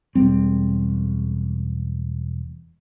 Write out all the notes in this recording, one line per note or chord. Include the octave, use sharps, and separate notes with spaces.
E1 G3 C4